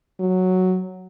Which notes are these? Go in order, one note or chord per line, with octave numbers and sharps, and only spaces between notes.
F#3